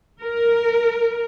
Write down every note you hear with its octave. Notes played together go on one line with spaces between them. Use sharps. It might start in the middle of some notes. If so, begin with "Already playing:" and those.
A#4